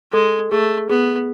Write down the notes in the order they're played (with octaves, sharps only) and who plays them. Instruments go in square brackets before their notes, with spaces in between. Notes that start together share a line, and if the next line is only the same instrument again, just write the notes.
[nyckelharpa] G#3 [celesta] A4
[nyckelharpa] A3 [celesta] G#4
[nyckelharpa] B3 [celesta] G#4